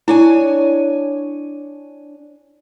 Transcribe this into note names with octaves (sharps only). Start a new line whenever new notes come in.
D4 E4 C#5 G#5